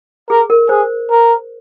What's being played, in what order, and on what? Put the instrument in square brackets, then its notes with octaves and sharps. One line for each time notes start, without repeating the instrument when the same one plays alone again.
[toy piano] G#4 [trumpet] A#4
[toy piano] A#4
[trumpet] G#4 [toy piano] C5
[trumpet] A#4